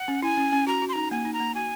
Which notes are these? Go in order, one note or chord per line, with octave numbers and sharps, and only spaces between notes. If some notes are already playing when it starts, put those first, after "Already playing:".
Already playing: F#5
C#4
E4 G#5
C#4
C#4
F#4 A#5
F#4
C6
D#4 A#5
A#3 G#5
D#4
A#5
A#3
F#4 G#5